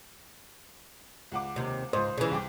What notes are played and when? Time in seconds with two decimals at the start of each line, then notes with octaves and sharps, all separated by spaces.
1.32 C#2 F#5 D6
1.56 D#2 C3
1.93 C#2 G#2 C5 D#6
2.18 C#3 E3
2.31 C2 G5 D6